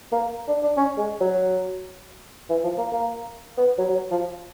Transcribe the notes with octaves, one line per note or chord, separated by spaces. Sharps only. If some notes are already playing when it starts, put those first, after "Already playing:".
A#3
D4
D4
C#4
G#3
F#3
E3
F3
A#3
A#3
B3
F#3
F#3
F3